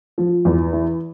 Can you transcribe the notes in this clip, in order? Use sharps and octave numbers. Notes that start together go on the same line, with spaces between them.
F3
E2
E3